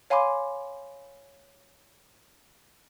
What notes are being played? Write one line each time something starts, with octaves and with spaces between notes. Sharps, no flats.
C#5 F5 G#5 B5 C6 D6